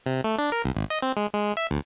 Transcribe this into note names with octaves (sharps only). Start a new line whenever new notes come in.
C3
A3
D4
A#4
C2
G#1
D#5
C4
G#3
G#3
E5
D2